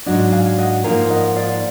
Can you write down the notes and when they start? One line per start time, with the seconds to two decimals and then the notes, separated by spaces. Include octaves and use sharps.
0.06 G#2 F#3 D4 D#5 F#5
0.32 F5 G#5
0.58 D#5 F#5
0.84 G#2 F3 A#3 D#4 A#4 F5 G#5
1.10 D#5 F#5
1.36 D5 F5